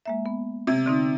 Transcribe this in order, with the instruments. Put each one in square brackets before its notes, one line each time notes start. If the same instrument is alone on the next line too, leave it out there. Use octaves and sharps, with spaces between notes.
[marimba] G#3 A#3 E5
B3
[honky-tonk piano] C3 [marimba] G#6
[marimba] D3 C4 D#4